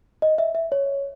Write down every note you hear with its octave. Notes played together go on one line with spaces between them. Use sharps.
D#5
E5
E5
C#5